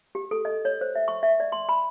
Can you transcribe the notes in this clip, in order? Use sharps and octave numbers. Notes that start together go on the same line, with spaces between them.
G4
A4
D#5
C#5
C5
E5
C#6
E5
D5
C6
B5